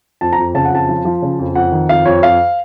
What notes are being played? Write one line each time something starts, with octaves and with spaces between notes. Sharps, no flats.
F2 A5
A#5
F2
C#3 A5
F#5
F2 A5
F3
F3
C#3
F2
F2 F#5
D#3
F2 F5
F2 C#5
F2 F5